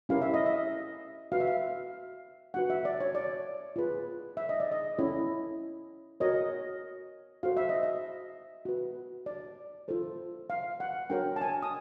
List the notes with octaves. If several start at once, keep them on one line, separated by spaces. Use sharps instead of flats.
C#4 E4 G4 A#4 C#5 F5
E5
D#5
E5
F#4 B4 F5
E5
F5
D4 F#4 B4 F#5
E5
D5
C#5
D5
F4 G#4 B4
E5
D#5
D5
D#5
C#4 E4 A4 C#5
F#4 A#4 C#5 D#5
F#4 A4 C5 F5
E5
D#5
E5
F#4 B4
D5
F4 A4 C5
F5
F#5
D4 F#4 A#4 C#5 G5
A5
G#5
D#6